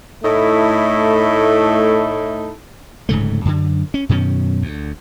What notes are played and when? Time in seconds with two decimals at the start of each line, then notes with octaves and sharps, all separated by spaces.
0.23 A2 A3 D#4 E4 A4
3.09 D1 G#2 C#3 A3
3.45 F#2 D3
3.94 C#4
4.09 F#2 B2 D#3 C#4
4.62 D2